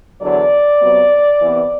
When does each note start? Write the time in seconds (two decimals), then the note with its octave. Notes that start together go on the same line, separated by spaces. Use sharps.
0.21 E2 D3 F#3 D5
0.82 C3 F#3 B3
1.42 C3 E3 B3